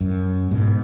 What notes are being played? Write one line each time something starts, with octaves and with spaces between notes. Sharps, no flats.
F#2
G#2 B2